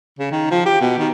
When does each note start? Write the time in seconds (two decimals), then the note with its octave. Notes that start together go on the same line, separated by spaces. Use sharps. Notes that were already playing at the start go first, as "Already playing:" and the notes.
0.19 C#3
0.31 D#3
0.51 F3
0.66 G4
0.81 B2
0.99 D#3